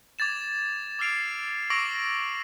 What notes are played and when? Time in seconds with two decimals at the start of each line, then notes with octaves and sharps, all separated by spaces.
0.19 D6 G#6 A6 E7
0.99 D6 E6 F6 C7 D7 F7
1.70 C#6 D6 E6 A#6 D7 F#7